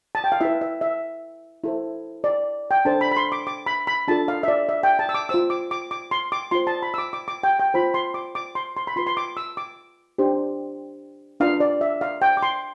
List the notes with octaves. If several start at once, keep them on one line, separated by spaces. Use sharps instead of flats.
A5
G5
F5
E4 B4 E5
E5
E5
E4 A4 C5
D5
G5
D4 A4 C5 A5
B5
B5
C6
D6
D6
B5
B5
D4 F4 A4 A5
F5
E5
D5
E5
G5
A5
E6
D6
F4 C5 E6
D6
D6
D6
C6
D6
F4 C5 C6
A5
B5
E6
D6
D6
D6
G5
G5
F4 C5 B5
C6
D6
D6
C6
C6
B5
F4 B4 C6
C6
D6
E6
D6
D4 G4 C5
D4 F4 B4 F5
D5
E5
F5
G5
D6
C6